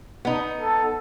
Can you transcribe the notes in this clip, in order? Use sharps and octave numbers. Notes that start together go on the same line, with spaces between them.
B3 D#4
A4